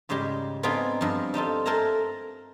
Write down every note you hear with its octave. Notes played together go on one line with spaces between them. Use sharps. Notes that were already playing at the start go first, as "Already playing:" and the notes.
G#2 C#3 G3 G#3 G4
B3 C4 D4 D#4 F4 G#4
G2 F3
G3 D#4 F4 A4
A4 A#4 C5 E5 G#5 A#5